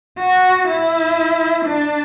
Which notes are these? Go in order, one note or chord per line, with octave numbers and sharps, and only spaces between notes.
F#4
E4
D4